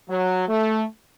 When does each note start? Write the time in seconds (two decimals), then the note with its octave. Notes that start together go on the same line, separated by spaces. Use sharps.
0.10 F#3
0.48 A3